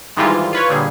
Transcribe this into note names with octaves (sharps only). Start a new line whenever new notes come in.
G#2 D#3 E3 G3 G#3 F4
F4 B4 C#5
A#2 D3 G3 G#4